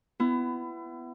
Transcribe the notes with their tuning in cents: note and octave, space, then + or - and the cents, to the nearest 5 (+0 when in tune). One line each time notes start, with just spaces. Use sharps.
B3 +20 E4 +30